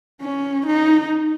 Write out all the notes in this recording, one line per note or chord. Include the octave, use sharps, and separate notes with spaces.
C#4
D#4